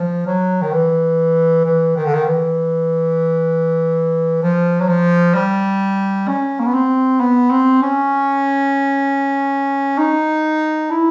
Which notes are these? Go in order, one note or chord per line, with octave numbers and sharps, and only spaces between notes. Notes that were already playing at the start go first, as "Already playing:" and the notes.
Already playing: F3
F#3
D#3
E3
E3
D#3
D3
D#3
E3
F3
F#3
F3
G3
C#4
A#3
B3
C4
B3
C4
C#4
D#4
E4